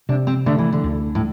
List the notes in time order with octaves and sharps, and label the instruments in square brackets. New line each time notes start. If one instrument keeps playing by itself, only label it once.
[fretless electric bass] C3 [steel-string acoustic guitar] D4
[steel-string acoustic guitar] C4
[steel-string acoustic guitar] D3 [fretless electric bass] A3
[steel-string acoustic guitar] E3
D3
[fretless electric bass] D2
[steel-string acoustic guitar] A2